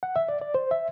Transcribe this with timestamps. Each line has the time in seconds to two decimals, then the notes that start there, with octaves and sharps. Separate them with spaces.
0.03 F#5
0.16 E5
0.29 D5
0.42 D5
0.55 C5
0.71 E5